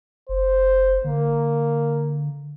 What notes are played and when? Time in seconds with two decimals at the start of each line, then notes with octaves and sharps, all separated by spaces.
0.29 F#1 C5
1.04 D3 A#3